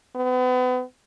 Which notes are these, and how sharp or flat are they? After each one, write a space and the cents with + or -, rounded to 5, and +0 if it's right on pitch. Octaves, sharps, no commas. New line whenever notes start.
B3 +35